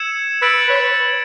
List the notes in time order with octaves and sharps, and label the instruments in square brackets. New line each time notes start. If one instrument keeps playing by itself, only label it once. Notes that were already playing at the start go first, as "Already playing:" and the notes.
Already playing: [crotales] E6 G#6 C#7 E7
[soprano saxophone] B4 [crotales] E6 A6 D7 F#7
[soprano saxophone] C#5
B4